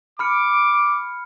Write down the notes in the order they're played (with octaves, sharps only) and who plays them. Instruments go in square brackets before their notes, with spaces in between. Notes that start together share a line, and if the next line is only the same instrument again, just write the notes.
[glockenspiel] B5 F6 C#7 [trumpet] D6